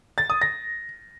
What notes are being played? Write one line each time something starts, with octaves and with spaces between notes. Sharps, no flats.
A6
D#6
A#6